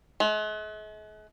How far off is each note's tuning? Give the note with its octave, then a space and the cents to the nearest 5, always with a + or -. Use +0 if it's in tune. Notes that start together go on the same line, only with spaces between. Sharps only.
G#3 +45